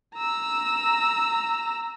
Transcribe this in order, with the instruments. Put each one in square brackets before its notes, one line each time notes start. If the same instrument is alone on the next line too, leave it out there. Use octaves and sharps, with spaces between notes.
[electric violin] A#5 E6